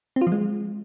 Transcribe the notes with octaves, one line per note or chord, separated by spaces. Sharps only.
C4
F4
F3
G#3